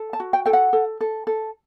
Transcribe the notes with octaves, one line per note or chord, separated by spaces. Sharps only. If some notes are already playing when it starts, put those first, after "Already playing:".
Already playing: A4
A5
F#4
G5
A4 G5
F#5
A4
A4
A4